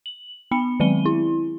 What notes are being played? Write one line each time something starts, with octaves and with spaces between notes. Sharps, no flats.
F#7
B3 B5 C#7
D#3 F#3 G#3 C4 D#7 G7
E4